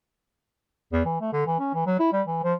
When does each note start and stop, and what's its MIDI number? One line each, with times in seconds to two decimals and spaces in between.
0.92 1.02 40
1.05 1.16 52
1.21 1.29 57
1.33 1.43 50
1.46 1.57 52
1.59 1.70 61
1.74 1.84 52
1.86 1.96 54
1.99 2.10 64
2.12 2.22 55
2.27 2.39 52
2.43 2.54 53